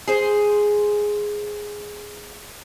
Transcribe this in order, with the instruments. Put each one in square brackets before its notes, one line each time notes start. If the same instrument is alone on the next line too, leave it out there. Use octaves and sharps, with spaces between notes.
[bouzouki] G#4 C5